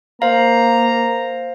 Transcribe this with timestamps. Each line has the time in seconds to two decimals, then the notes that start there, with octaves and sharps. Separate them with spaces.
0.22 A#3 C5 F5 A#5